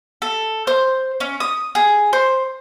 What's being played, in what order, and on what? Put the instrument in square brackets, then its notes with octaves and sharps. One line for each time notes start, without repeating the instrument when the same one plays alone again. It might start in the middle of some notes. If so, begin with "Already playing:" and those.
[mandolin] A4
C5
C#4
D#6
G#4
C5